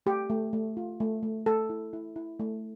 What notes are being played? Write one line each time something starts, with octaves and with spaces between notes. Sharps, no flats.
A3 G4
A3
A3
F4
A3
A3
A3 A4
E4
E4
E4
A3